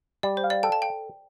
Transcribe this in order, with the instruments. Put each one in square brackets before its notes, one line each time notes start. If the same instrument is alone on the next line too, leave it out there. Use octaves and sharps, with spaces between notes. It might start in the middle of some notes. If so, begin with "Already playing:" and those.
[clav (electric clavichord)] G3 [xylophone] D5
[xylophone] C5
[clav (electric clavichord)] F5
[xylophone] D5
[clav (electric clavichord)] A4 [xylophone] G5
[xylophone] A5
G5